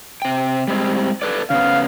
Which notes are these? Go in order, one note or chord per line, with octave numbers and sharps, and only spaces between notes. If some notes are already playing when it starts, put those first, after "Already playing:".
C3 G5
G3 G#3 C4
A4 B4 D5
C#3 B3 F5